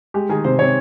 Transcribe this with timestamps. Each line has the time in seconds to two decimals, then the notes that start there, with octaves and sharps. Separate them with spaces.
0.14 G#3 G4
0.29 D#3 G#4
0.44 C3 C5
0.59 C3 C#5